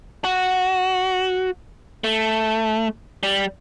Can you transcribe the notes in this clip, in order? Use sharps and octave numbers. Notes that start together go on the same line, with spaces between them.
F#4
A3
G3